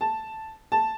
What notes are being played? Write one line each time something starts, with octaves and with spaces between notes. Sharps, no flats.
A5
A5